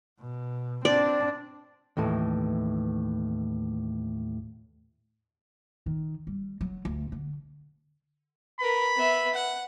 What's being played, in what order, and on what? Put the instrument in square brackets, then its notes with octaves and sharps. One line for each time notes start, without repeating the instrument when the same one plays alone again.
[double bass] B2
[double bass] C4 D4 [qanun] D5
[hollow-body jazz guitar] D#2 A2 E3 A4
[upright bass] D#3
G3
F#3
D2
D3
[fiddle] A#4 B4 [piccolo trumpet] B5
[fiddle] B3 E5
F#5